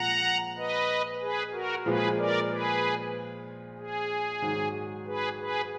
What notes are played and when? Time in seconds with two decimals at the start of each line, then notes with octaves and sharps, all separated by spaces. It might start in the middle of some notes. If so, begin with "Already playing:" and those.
Already playing: A#2 F3 G#3 F#5 A#5
0.57 B4 D#5
1.21 G#4 B4
1.53 F#4 A#4
1.86 A#2 F3 G#3 G#4 B4
2.17 A#4 D5
2.49 G#4 B4
3.78 G#4
4.42 G#2 D#3 F#3
5.06 G#4 B4
5.39 G#4 B4